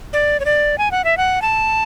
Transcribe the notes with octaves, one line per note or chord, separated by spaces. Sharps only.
D5
C#5
D5
G#5
F#5
E5
F#5
A5